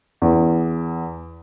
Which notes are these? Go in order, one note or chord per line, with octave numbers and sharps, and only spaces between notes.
E2